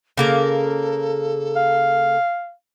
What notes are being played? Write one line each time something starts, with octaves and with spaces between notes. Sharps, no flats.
C#3 A#3 A4 A#4
F5